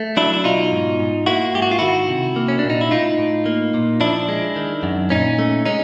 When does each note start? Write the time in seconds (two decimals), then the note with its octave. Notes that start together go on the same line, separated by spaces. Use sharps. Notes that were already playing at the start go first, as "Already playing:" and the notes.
Already playing: A3
0.17 F#3 D4 E4
0.34 E4
0.44 B2 D#4 F4
0.72 G#2
1.00 G#2
1.26 A#3 E4 F#4
1.54 G#2 G4
1.62 F#4
1.71 F4
1.79 D#3 E4 F#4
2.09 C3
2.36 A#3
2.48 C#4
2.59 D4
2.64 A#2
2.70 D#4
2.81 E4
2.91 A2 D#4 F4
3.19 A2
3.46 A#3
3.74 A#2
4.01 F3 D4 E4
4.29 G#3
4.56 D#3
4.83 F#2
5.10 A#2 C#4 D#4
5.39 A3
5.65 G#3 C#4 D#4